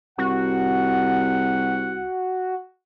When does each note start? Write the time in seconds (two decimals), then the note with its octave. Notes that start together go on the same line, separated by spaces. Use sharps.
0.18 C2 F#4 F#5